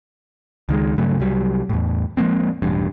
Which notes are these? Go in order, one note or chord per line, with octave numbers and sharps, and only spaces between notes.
C#2 D#3 G3 G#3
G2 C#3 F#3 A3
C2 F#3 G3
E2 A2
F3 G#3 A#3 C4
E1 A1 G2